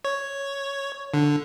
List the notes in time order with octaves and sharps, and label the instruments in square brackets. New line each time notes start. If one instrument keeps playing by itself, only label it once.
[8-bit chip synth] C#5
D3